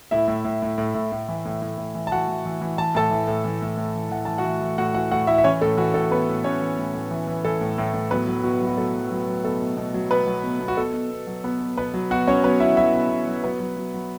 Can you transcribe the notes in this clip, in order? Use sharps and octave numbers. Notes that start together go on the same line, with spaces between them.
A2 E4 E5
A2
A2
A2
A2
A2
A2
E3
A2
A2
A2
E3
A5
E3 F#4 F#5
E3
E3
E3
E3 A5
A2 A4 A5
E3
A2
E3
A2
A2
E3
E3 F#5
E3 A5
F#4 F#5
E3
E3
A2 F#4 F#5
E3 F#4 F#5
A2 F#4 F#5
A2 E4 E5
E5
E3 C#4 C#5
A2 A4
E3 F#4
A2 A4
A2 B3 B4
A2
A2 C#4 C#5
E3
A2
A2
E3
E3
E3 A4
A2
A2
A2
F#3 B3 B4
F#3
B2 F#4
F#3
F#4
F#3 A4
F#3
F#3
F#3
B2 A4
B2
B2
F#3
B2 B3 B4
F#3
B2
B2
F#4
B2 A4
B2
B2
F#3
B2 B3 B4
B2
B2 B3 B4
F#3
B2 F#4 F#5
F#3 C#4 C#5
F#3 B3 B4
B2 E4 E5
F#3 E4 E5
B2
B2
F#3
F#3 B3 B4
F#3
F#3
F#3